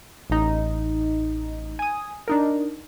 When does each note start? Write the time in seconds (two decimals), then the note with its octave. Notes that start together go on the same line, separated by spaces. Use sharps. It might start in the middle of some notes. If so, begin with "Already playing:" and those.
0.30 A1 D#4
1.79 G#5 D#6
2.28 D4 D#4 A#4